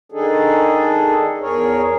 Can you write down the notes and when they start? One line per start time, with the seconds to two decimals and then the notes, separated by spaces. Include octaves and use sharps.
0.12 D#3 D4 D#4 G#4 A4
1.41 E2 G#4 A#4 C#5